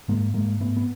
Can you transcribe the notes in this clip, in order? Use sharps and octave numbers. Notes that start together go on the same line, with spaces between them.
G#2 G#3 A#3
G#2 G#3 A#3
G#2 A3 B3
B3